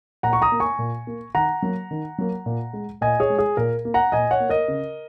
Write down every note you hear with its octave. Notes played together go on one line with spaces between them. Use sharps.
A#2 F#5 A#5
C#6
A#5 D#6
A#3
G#5 C#6
A#2
A#3
D#3 F#5 A#5
F#3 A#3
D#3
F#3 A#3
A#2
G#3
A#2 D#5 G#5
G#4 C#5
G#3
G#4
A#2 A#4
A#3
F#5 A#5
A#2 D#5 G#5
C#5 F#5
A#3
A#4 D#5
C#3